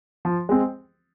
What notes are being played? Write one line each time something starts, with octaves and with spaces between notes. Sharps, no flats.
F3
G#3 C4